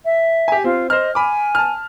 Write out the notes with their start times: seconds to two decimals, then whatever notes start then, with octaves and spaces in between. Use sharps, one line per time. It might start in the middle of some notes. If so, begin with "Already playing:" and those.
0.05 E5
0.48 G4 G#5
0.64 C4 F4
0.90 C5 D#5 F6
1.15 G#5 B5 D6
1.55 A5 F6